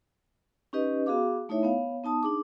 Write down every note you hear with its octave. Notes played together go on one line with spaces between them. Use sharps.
C#4 D#4 G4 B4 D#5
B3 F#4 G#4 F5 D6
A3 D#4 E4 C#5 E5
B3 C#5 F5
B3 D#4 A5 D#6
D4 D#4 G#4 D6